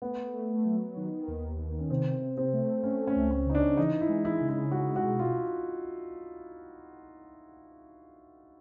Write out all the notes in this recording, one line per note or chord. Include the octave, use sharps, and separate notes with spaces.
A3 B3
A3
F#3
D#3
D#2
D#3
C#4
C3 C4
C3
C4
A3
A3 C#4
C#4
C#2
C#4
C#3 D#4
D4
E3 D#4
E4
G#3
E4
C#3
E4
G#3 F#4
F#4
B2
F4